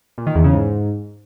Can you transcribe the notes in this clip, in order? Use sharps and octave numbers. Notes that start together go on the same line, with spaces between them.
A#2
D#3
E2
C#3
G#2